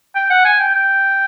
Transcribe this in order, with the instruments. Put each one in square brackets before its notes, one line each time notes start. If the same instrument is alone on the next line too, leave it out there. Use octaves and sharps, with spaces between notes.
[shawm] G5
F#5
G#5
G5
G5